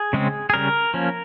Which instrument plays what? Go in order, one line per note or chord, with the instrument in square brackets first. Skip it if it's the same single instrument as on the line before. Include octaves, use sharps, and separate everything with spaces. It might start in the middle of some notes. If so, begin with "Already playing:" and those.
Already playing: [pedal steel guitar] G#4
C#3 G#3 C4
G#4
C#3 G3 C#4 A#4
F3 A#3 C#4